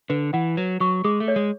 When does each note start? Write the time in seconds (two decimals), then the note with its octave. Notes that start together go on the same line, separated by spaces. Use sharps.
0.10 D3 B4
0.33 E3 F#5
0.57 F#3 B4
0.80 F#3 C#6
1.04 G#3 G#4
1.20 A3
1.28 C#5
1.36 G#3